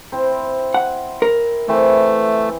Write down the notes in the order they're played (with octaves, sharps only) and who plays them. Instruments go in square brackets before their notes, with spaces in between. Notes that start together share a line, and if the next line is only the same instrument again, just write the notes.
[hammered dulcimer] C4 E4 C5
[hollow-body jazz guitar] F#5
A#4
[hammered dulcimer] E3 C4 [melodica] A3